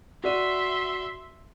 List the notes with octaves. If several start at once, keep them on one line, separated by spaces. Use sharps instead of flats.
F#4 D5 E5 C6 D#7